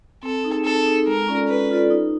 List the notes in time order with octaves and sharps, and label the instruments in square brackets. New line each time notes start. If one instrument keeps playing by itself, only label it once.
[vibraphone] C4 [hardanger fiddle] A4
[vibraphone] D#4 G#4
[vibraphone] C4 [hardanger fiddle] A4
[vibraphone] D#4 G#4
[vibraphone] G#3 [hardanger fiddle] A#4
[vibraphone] C#4 F4 A4 D5
[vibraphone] G#3 [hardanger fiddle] B4
[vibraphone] C#4 F4 A4 D5
D#4